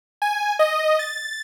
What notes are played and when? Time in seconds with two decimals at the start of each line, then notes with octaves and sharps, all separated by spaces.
0.22 G#5
0.59 D#5
0.99 A6